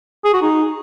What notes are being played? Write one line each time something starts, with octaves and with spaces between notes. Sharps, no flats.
G#4
F#4
D#4